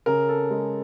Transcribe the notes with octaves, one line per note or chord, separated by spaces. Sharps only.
C#3 A#4
A4
G#3